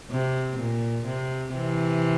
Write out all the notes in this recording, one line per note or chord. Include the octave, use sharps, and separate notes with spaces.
C3
A#2
C3
C3 E3